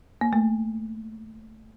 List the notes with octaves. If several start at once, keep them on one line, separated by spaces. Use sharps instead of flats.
A#3
A3